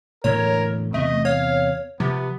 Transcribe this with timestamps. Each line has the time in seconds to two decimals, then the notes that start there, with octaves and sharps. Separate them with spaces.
0.24 E1 A2 D3 A#4 C#5
0.94 E2 C3 A3 B3 D#5
1.25 C#5 F5
2.00 C3 F3 B3